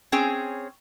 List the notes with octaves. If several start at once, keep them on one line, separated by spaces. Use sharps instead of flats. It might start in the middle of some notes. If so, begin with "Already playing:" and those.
C4 C#4 G#4 C#5 G5